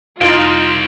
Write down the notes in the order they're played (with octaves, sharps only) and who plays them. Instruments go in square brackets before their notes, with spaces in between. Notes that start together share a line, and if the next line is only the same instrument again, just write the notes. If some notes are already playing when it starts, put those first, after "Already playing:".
[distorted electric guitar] C2 [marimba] F2 [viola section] D#4 F4 [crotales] D7